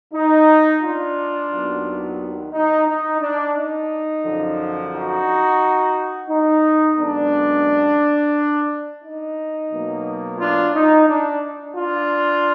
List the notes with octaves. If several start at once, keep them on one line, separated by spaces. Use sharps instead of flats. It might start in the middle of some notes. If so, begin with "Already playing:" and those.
D#4
D4 F4
D#2 D#3 F#3 B3
D#4
D#4
D4
D#4
F#2 D3 F3
D#4 F#4
D#4
F#2 D3 G#3 B3 D4
D#4
B2 F#3 A#3
D4 F4
D#4
D4
D4 F4